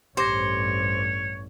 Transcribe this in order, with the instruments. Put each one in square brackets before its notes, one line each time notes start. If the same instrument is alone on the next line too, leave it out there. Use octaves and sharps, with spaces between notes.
[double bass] A1 G2 [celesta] G4 D6 A#6 [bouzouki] C5 [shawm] C#5